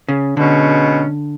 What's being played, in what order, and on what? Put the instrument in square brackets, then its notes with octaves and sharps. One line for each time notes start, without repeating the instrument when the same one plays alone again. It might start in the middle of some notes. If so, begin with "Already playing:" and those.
[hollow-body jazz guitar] C#3
[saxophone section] B2 G#3 C#4 [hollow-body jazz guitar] D3